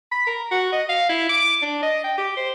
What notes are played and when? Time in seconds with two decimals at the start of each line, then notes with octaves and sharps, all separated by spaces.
0.12 B5
0.27 A#4
0.52 F#4
0.73 D#5
0.89 F5
1.09 E4
1.29 D6
1.62 D4
1.83 D#5
2.04 G5
2.18 G4
2.37 C5